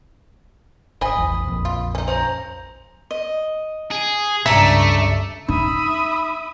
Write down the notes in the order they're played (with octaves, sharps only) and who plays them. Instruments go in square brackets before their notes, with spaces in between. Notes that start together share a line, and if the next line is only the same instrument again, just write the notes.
[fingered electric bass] G1 [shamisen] C5 D#5 G#5 [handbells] B5 D#6
[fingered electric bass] A1 E2
A#1 F2
[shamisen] F4
C#4 D#4
[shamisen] F3 C#4 [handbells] C5 A#5
[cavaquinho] D#5
[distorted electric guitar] G#4
[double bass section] C#2 G2 C#3 [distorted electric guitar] A3 [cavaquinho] D5 A#5 [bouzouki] E5
[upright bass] D#4 [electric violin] E5 D#6 [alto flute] B5